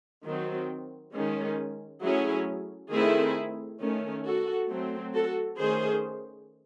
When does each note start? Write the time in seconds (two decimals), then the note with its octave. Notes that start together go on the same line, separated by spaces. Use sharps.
0.25 D#3 F#3 C4
1.14 D#3 G#3 C#4
2.02 F#3 A3 C#4 E4 G#4
2.91 D#3 A3 C4 E4 G#4
3.80 D#3 A3 C#4
4.24 F#4 A4
4.70 F#3 A3 C4
5.14 F#4 A4
5.57 D#3 A3 C#4 G#4 C5